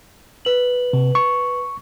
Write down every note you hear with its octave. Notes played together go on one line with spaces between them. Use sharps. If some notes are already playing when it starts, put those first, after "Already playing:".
B4 F#7
C3
C#6